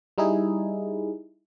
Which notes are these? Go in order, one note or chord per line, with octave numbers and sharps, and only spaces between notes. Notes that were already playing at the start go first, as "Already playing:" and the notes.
G3 D#4 E4 G#4